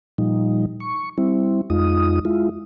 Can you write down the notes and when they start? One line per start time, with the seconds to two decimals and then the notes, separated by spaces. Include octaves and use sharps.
0.18 A#2 F3 G3 D#4
0.80 C#6
1.18 G3 C4 E4
1.70 F2 G#3 D#4 F4 D#6
2.25 G#3 E4 F4